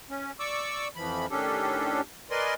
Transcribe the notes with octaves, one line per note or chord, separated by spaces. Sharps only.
C#4
D5 C#6 D6 E6
F2 E3 F3 B5
A2 D#3 C#4 D4 G4 A4
A#4 B4 D5 D#5 G#5 C6